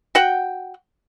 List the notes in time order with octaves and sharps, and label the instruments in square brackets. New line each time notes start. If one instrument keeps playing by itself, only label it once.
[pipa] F#4 F#5 G5